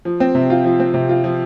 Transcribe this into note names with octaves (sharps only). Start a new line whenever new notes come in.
F3
C4
C3
F4
F3
C4
C3
F4
F3